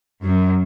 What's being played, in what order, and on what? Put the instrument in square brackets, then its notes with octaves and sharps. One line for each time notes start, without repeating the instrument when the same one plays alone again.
[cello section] F#2